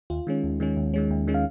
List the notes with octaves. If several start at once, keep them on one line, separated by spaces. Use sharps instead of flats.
D#2 F4
D#3 G#3 C#4
D#2
D#3 G#3 C#4
D#2
D#3 G#3 C#4
D#2
D#3 G#3 C#4
F5